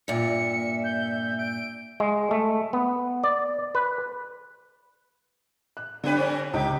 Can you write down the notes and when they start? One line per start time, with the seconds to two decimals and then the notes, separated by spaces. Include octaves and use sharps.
0.08 G2 A#2 E5 C#7
0.84 G6
1.39 D7
2.00 G#3
2.31 A3
2.73 B3
3.24 D5
3.75 B4
5.77 F#6
6.04 D3 D4 G4 B4
6.15 G3 C4 C#4
6.53 C#2 D#4 G4